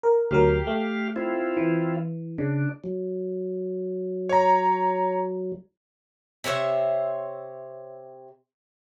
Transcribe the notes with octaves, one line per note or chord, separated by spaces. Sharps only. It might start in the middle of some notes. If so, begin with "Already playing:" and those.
A#4
D2 F#3 G4 A#4 F5
A3
C4 E4 F4
E3
C#3 D4
F#3
C#5 A#5
C3 C5 C#5 E5